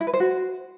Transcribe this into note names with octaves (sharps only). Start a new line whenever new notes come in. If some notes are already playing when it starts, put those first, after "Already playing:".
E4
B4
C5
F#4